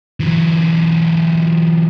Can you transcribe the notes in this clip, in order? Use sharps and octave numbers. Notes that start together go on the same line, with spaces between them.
E3 F#3